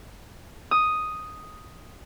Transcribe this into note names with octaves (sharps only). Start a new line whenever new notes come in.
D#6